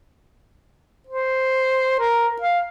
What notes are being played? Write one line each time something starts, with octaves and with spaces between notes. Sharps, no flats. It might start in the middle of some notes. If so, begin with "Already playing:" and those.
C5
A#4
F5